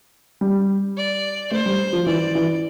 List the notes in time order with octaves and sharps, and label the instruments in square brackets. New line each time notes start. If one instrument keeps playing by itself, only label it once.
[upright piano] G3
[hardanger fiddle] D5
[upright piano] A3 [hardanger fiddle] C5
[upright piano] G3
F3
[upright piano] E3 [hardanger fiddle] D5
[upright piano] E3